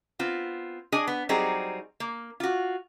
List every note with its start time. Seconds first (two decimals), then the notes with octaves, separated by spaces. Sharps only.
0.19 B3 C4 F4
0.92 D4 G#4 D#5 G#5
1.07 B3
1.29 F#3 G3 C4 D#4 G#4
2.00 A#3
2.40 F4 F#4